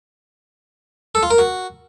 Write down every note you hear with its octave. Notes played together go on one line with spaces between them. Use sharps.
A4
F4
A#4
F#4